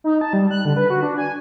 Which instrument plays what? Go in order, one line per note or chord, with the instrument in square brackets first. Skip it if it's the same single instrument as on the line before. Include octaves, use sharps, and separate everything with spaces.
[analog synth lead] D#4
A5
G3
F#6
D3
B4
F#4
D4
G#5